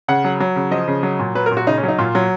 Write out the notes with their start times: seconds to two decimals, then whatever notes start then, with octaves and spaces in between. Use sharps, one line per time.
0.08 C#3 F#5
0.25 F#3
0.40 F#3
0.56 C#3
0.71 F3 D#5
0.88 C#3
1.03 F#3
1.19 A#2
1.35 F#3 B4
1.46 A#4
1.51 A#2
1.57 F#4
1.67 C#3 D#4
1.78 C#4
1.83 F#3
1.88 D#4
1.98 A#2 F4
2.15 F#3